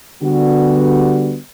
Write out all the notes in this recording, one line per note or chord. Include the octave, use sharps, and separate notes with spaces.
D3 G3 B3 F#4